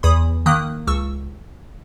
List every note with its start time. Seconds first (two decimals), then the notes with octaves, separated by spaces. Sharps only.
0.03 E2 B5 D#6
0.46 D#3 A#3 D#6 F#6
0.87 C#2 C#6 E6